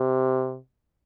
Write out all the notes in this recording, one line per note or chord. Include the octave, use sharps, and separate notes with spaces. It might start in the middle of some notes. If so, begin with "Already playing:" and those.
Already playing: C3